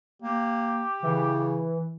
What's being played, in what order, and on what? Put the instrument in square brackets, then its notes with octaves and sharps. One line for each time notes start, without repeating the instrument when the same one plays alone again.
[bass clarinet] A#3 [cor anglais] G4
[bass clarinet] C#3 [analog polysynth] E3